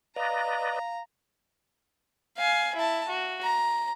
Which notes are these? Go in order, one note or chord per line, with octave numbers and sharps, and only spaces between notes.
B4 D5 D#5 F5 A#5
F5 G#5
E4 A5
F#4
A#5